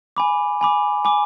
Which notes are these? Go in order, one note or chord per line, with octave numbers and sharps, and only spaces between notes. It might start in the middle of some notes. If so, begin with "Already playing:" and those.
G#5 B5 D6
G#5 B5 D6
G#5 B5 D6